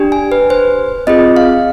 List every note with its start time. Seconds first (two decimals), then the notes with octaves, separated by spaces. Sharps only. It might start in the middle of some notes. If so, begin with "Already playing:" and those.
Already playing: D4 G4
0.12 G#5
0.32 B4
0.50 C5
1.07 C4 F4 G#4 D#5
1.36 F5